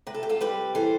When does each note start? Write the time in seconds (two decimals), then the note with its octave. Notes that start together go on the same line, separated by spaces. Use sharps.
0.07 C3 B4
0.15 A4
0.23 G4
0.29 F4 A4
0.41 G3 G4 B4
0.75 E3 A4 C5